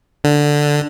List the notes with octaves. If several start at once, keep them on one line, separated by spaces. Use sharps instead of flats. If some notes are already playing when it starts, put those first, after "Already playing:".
D3